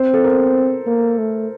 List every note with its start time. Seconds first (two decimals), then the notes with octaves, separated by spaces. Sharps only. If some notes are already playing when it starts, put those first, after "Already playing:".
Already playing: C4 C5
0.14 A4
0.24 A#4
0.87 A#3
1.18 A3